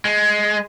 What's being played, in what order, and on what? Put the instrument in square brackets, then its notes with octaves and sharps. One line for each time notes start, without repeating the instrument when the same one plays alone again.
[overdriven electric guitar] G#3